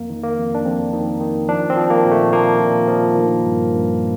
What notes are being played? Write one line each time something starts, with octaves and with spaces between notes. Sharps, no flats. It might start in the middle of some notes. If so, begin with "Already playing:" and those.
Already playing: F2 A#3
D#3
A#3
F2
D4
F2 C4
D#3
D#3
F3 D4
C4
F3
A#3
A#2
A3
F3 A#3
A#2
F3
D#3
G2
G2